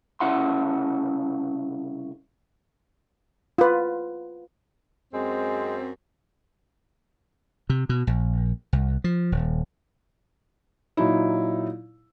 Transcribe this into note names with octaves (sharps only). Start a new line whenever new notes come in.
C2 C#3 C#4 E4 F#5 C6
F4 B4
F#2 G#3 C4
C3
B2
A#1
C2
F3
D#1
A#2 F#3 D#4 E4